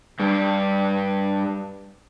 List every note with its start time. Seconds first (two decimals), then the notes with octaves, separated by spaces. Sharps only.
0.20 G2 G3